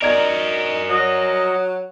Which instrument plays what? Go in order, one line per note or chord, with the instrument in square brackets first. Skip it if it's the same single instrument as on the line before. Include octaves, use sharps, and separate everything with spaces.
[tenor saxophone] D#4 [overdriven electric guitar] F#4 A#4 [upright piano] D5 G#6
[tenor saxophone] F#3 [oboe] D#5